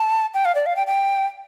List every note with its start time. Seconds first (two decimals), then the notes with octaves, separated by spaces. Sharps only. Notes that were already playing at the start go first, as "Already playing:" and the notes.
Already playing: A5
0.34 G5
0.45 F5
0.55 D5
0.66 F5
0.76 G5
0.87 G5